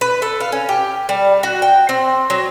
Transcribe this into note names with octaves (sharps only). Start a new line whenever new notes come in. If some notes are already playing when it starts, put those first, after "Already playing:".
B4
A4
F5
C#4
G4
G3
F#4
G5
C4
F#3